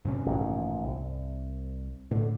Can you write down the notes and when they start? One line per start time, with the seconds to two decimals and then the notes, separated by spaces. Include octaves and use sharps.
0.05 G2 C3 C#4
0.26 A1 A#2 D#3
0.84 C2
2.11 A2 D3